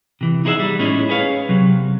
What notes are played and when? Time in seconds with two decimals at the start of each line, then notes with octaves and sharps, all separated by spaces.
0.21 C3 E3
0.45 D#4 E4 G#4 C5 E5 F#5
0.60 G3
0.79 A2 G#3 C#4 D#4 E4
1.09 G#4 B4 C#5 F5
1.49 C3 F#3